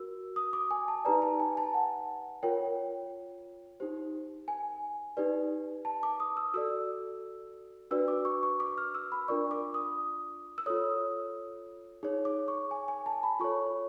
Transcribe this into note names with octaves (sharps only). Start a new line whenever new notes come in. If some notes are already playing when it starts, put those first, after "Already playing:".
Already playing: F#4 A#4 E6
D#6
D6
G#5
A5
D#4 G4 B4 D5 A#5
A5
G#5
A5
F#5
F4 A#4 C#5 G5
D#4 G4 C5
G#5
D#4 G4 B4 D5
A5
D6
D#6
E6
F#4 A4 D5 E6
D4 F#4 B4 D5 E6
D6
C#6
C#6
D6
F6
E6
B5
D4 F4 A#4 D5 C#6
D6
D#6
E6
F4 A4 C#5 D#6
D#4 G#4 C#5
D6
C#6
G#5
G#5
A5
B5
F4 A4 C#5 C#6